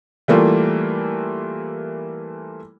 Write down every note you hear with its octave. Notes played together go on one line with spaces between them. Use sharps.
E3 G3 A3 A#3 F4